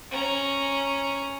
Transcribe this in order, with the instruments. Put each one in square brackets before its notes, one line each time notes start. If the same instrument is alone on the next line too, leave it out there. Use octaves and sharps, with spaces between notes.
[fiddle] C#4 A#5